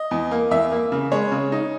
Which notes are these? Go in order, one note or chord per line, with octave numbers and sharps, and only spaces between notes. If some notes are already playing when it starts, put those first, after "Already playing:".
Already playing: D#5
E2
A#3
E2 E5
A#3
C#3
G#3 C#5
C#3
D#4